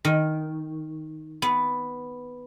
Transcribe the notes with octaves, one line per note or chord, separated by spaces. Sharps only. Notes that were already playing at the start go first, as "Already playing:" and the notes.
D#3
B3